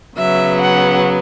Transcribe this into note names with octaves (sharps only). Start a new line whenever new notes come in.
C#3 F#3 B3 E5
F#5